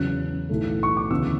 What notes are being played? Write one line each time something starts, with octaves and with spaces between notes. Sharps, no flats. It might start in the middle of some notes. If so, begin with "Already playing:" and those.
Already playing: E2 C#3 F#3 C#4 F#6
B1 A2 E3 A3
C#6
D6
D2 C#3 E3 B3 E6